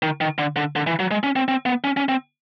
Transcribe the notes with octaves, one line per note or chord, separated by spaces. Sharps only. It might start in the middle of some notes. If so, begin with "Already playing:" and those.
D#3
D#3
D3
D3
D3
E3
F#3
G#3
C#4
C4
C4
B3
C#4
C#4
C4